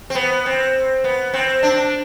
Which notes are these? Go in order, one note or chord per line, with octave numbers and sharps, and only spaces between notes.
C4
B3
C4
B3
C4
D4